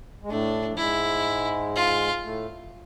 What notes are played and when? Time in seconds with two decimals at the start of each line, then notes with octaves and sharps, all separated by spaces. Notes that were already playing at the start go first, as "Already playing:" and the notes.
0.23 G#3
0.29 A2 A3 D4
0.71 F3
0.78 G#2 G#3 E4
1.75 F4
2.24 A2 A3